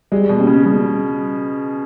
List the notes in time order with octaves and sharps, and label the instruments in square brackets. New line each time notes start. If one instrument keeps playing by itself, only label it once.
[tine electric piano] G3 [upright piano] G#3
[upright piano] B2
[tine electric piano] A#3 C#4 G4
[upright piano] C#3
[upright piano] C#3 [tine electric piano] G3